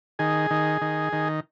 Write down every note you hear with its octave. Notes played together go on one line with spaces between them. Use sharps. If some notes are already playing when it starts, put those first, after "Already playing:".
D#3 G#4
D#3
D#3
D#3